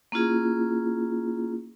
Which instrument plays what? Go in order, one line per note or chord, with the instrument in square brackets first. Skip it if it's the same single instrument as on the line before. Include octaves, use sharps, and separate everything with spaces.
[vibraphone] A#3 C#4 E4 F4 G#4